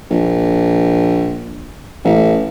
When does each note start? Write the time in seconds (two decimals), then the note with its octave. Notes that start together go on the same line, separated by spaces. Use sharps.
0.10 A#1
2.04 A1